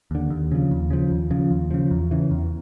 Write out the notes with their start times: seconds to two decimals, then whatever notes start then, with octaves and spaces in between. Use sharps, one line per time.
0.11 D#2 D3
0.30 D#2
0.51 C#3 F3
0.71 D#2
0.90 C#3 F3
1.11 D#2
1.31 C#3 F3
1.51 D#2
1.71 C#3 F3
1.91 E2
2.11 C#3 E3
2.31 E2